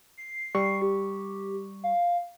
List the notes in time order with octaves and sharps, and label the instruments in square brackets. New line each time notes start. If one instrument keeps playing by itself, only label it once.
[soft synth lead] C7
[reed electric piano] G3 C#6
[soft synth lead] G4
F5